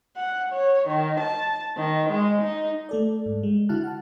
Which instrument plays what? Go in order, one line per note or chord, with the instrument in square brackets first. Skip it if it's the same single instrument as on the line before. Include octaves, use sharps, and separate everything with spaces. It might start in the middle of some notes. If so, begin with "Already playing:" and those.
[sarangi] F#5
C#5
D#3
A5
D#3
G#3
D#4
[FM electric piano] A3 A4 D5
G#2
G#3
D3 E4 F#4 A5 F6 F#6
F#5 A5